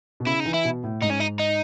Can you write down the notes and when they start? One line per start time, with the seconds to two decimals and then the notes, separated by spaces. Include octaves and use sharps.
0.20 B2
0.26 C#3 E4
0.40 D#4
0.46 E3
0.54 E4
0.65 B2
0.84 A2
1.02 G#2 D#4
1.10 C#4
1.20 D#4
1.40 D#4